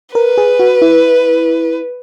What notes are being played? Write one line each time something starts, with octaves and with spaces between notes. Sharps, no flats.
A#4 B4
G#4
F#4
E4